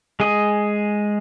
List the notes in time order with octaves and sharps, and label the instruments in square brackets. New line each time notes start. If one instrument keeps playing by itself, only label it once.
[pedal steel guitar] G#3 G#4 D#5